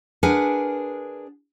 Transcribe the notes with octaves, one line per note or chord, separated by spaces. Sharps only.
D4 G#4 A#4 B4 F#5 G#5